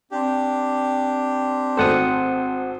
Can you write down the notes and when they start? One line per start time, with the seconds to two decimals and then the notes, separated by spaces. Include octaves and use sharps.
0.11 C4 D4 G4
1.77 G#1 A3 A4 C5 F#5 D#6